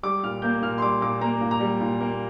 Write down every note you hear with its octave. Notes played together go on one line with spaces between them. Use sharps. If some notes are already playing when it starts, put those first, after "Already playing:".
G3 D6
A#2 F6
A#3 G6
A#2 F6
C6
G3 D6
A#2 D6
A#3 A#5
A#2
A#5
G3
A#2
A#3